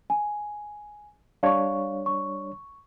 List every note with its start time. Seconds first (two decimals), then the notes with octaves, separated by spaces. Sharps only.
0.10 G#5
1.43 G3 D4 C#5 F5 C#6
2.06 C#6